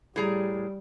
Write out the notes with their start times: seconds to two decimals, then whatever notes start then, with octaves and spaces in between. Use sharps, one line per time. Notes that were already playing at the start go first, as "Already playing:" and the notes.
0.16 A2 G3 G#4 A#5